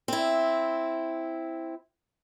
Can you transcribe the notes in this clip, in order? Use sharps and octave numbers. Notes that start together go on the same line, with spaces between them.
C4 E4